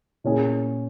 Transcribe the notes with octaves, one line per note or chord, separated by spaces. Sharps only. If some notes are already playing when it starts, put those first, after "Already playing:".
A#2 A#3 C#4 E4 G#4